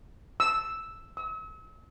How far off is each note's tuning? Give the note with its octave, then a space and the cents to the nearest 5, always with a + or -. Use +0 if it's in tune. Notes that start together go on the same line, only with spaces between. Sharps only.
E6 +0
E6 -40